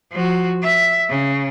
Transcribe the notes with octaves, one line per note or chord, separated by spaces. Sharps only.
F3 F#4
E5
C#3